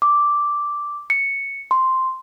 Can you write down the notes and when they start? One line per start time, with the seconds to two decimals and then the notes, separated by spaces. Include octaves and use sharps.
0.02 D6
1.10 C#7
1.71 C6